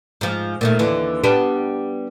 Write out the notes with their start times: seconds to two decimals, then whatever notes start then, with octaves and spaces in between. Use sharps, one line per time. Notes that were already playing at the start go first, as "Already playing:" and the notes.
0.21 G#2 F3
0.61 A#2 D#3 A3
0.79 D#2 D3 E3
1.24 G3 B3 D4